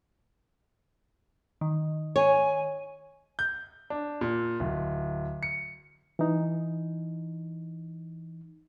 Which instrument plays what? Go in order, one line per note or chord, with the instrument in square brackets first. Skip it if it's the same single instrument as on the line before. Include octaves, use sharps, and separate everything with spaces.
[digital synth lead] D#3
[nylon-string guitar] C#5 [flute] G#5
[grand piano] G6
D4
A#2
D1
C#7
[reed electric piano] E3 D#4